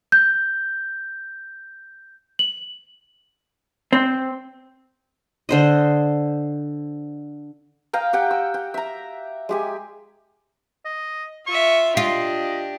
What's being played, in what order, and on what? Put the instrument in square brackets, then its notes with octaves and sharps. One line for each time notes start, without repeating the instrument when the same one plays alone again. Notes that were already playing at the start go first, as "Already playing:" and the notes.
[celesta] G6
F#7
[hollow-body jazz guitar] C4
[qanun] D3 C5 D#5
[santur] D#5 F5 G5 A#5
G4 F#5 G5
E6
G5
E5 A#5
G#3 G4 G#5
[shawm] D#5
[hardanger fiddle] F4 E5 [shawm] C#6
[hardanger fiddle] D4 G4 [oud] F4 [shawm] D#5